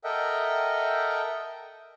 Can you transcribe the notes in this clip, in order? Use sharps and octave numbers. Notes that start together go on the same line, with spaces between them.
A4 A#4 D#5 E5 F#5 G5